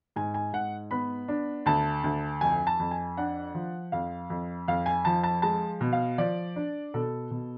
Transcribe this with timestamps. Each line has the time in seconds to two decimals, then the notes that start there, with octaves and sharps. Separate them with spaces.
0.16 G#2 G#5
0.34 G#5
0.53 G#2 F#5
0.91 B3 B5
1.28 D4
1.66 D2 A5
2.04 D2
2.41 F2 G#5
2.67 A5
2.80 F2
2.91 G#5
3.17 D4 F#5
3.55 F3
3.92 F2 F5
4.30 F2
4.68 F2 F5
4.86 G#5
5.05 F3 A5
5.23 A5
5.42 G#3 A5
5.81 B2
5.93 F5
6.18 F3 D5
6.56 D4
6.94 B2 A4
7.31 B2